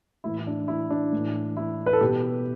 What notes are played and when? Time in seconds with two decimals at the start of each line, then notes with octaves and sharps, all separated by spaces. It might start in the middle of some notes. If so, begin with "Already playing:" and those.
0.24 A2 E3 E4
0.37 E4
0.47 D4
0.68 E4
0.90 D4
1.12 A2 E3
1.57 E4
1.86 B4
1.93 A4
2.01 B2 G4